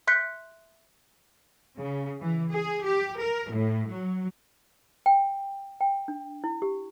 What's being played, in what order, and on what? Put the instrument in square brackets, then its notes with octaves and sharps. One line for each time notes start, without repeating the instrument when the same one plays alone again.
[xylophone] E5 C6 F#6 G6 B6 C#7
[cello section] C#3
E3
G#4
G4
A#4
A2
F#3
[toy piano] G5
G5
D4
E4
G4